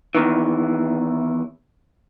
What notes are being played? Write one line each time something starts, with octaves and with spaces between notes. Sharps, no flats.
E2 D#3 E3